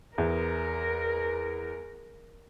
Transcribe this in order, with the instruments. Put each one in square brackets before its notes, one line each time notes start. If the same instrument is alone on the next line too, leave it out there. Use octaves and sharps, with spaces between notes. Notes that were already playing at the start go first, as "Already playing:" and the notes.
[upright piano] E2 [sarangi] A#4